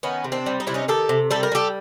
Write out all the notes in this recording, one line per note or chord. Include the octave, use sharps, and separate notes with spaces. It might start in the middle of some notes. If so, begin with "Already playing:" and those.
D#3 B3 C#4
C3
C4 D4
G3
D#4
C3 E4
C#4 D#4
D#3 G4 A4
C3
G3 A4
A#4
G3 G4 A4